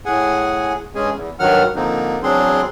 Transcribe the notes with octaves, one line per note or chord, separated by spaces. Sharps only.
A2 G#4 F#5 G#5
G2 G#3 C#4 G#4 G#5
E2
G2 D#3 F#3 F#5 F6
D3 F3 A#3 C4 D#4
E2 F#3 C4 D4 G#4 C6